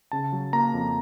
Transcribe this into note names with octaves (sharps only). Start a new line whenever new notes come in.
C#3 A5
F#3
A#3 A#5
F2